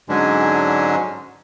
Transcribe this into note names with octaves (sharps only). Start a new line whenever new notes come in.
G#2 D3 F#3 G#3 C#4 D4